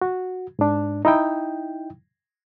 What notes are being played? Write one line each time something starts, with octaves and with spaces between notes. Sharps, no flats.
F#4
G#2 D4
D#4 E4 G5